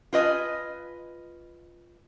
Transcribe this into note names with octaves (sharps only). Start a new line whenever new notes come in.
F4 B4 D#5 G#5